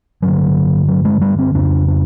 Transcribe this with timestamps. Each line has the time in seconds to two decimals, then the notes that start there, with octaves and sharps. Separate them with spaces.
0.22 G2 D3 F#3
0.88 F#3
1.05 G#3
1.21 G3
1.39 C4
1.55 F2 C#3 D4
1.88 D4